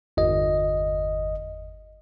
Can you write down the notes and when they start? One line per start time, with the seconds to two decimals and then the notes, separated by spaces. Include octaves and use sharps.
0.17 G1 E2 D#5